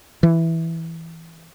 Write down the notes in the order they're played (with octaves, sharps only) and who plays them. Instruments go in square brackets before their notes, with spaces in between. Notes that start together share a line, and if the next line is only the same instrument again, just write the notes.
[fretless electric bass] E3